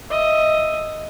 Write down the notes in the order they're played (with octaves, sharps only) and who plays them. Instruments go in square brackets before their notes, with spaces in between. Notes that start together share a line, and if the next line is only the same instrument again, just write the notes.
[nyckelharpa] D#5 E5